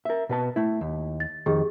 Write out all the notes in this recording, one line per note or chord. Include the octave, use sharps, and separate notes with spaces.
A#4 E5
B2 B4 A5
A3 E4
D#2
A6
F2 D#3 G4 G#4